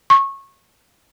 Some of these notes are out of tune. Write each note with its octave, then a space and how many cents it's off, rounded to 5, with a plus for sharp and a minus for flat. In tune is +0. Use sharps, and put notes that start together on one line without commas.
C#6 -20